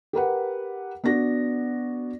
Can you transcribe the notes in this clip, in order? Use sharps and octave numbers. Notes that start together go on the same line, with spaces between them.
G4 A#4 B4 F#5
B3 D4 F#4 A#6